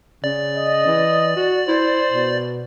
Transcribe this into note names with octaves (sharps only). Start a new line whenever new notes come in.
C#3 D5
D#5
E3
F#4
E4 C5
B2